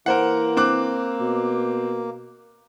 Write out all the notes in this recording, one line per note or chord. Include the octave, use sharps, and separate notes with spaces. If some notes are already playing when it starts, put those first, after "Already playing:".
E3 A#3 A#4 C5 F#5
C4 D6 F#6
B2